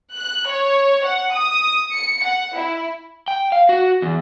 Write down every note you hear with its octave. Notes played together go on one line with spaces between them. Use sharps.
F#6
C#5
F#5
D#6
C#7
F#5
E4
G5
F5
F#4
E2